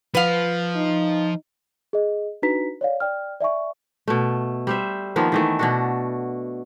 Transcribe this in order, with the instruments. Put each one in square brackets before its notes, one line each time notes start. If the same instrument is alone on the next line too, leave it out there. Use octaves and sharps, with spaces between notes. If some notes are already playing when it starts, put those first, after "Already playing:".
[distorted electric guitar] F3 [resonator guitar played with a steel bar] B4 F5
[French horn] D#4
[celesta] G#4 D#5
D4 D#4 F#4 B4 A#5 B6
C#5 D5 F5
D5 G5 F6
D5 E5 G#5 C#6
[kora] B2 A3
G3 C5 E5
D#3 F3 A#3 B3
D#3 E3 A3
B2 D4 F#4